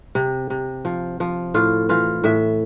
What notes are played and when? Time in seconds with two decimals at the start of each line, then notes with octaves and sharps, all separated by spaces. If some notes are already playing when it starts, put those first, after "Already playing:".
0.15 C3
0.50 C3
0.85 F3
1.20 F3
1.54 A2 F4
1.89 E3 F4
2.24 A2 E5